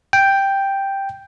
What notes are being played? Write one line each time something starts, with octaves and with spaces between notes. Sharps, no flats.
G5